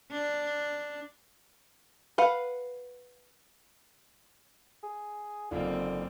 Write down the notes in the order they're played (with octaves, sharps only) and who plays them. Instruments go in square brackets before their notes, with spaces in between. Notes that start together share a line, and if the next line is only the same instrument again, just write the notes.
[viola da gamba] D4
[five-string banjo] B4 F5 F#5
[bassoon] G#4
[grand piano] F#1 D#4 F4 [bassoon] D3 [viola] A#3 C4